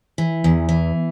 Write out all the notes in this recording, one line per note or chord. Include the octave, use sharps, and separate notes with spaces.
E3
E2
E3